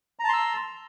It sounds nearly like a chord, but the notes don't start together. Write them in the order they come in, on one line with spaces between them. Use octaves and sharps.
A#5 A5 C6 E6